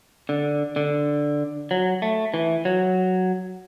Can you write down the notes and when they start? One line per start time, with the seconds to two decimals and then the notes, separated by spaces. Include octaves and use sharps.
0.29 D3
0.76 D3
1.71 F#3
2.02 A3
2.34 E3
2.65 F#3